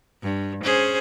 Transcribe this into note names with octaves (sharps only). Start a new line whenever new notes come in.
G2
C#4 G#4 C5